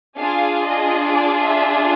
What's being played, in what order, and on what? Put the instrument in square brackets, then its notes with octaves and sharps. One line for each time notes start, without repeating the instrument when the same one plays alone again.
[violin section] D4 F4 G#4 F5
D#5
D5
E5